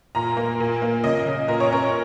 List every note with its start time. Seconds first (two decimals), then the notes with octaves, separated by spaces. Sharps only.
0.15 A#2 A#5
0.37 A#3
0.60 A#2
0.82 A#3
1.04 C#3 D#5
1.26 C#3
1.48 A#2 A#4
1.60 C#5
1.71 C#4 A#4